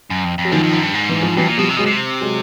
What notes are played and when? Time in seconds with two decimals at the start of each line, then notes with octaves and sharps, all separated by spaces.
0.10 F#2
0.25 F2
0.38 F2
0.45 F#3
0.52 F#2 D#3 F3
0.63 F2
0.73 F#2
0.83 G2
0.95 G#2
1.09 E3
1.23 F3
1.36 G2 E3 F#3
1.47 A#2
1.57 B2 F3 G3
1.69 C3
1.77 B2 F#3 G#3
1.86 C3
2.21 F#3 G#3